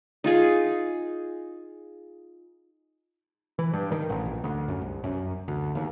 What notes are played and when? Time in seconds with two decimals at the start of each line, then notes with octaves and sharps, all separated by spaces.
0.24 D#4 F4 G#4
3.59 E3
3.73 G2
3.92 D#3
4.10 A1
4.26 A#1
4.44 D2
4.68 F#2
4.82 C2
5.04 F#2
5.48 D2
5.75 D#2